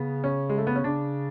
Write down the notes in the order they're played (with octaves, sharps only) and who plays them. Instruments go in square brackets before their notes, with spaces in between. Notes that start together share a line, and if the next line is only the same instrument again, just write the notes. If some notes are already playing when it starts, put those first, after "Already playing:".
Already playing: [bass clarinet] C#3 [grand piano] B3
[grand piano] C#4
G#3
A3
B3
C#4
[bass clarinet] C#3 [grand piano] D4